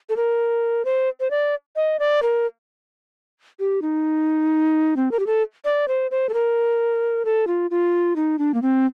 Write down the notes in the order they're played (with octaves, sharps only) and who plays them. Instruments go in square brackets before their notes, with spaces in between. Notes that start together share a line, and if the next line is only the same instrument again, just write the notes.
[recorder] A4
A#4
C5
C5
D5
D#5
D5
A#4
G4
D#4
C4
A#4
G4
A4
D5
C5
C5
A4
A#4
A4
F4
F4
D#4
D4
A#3
C4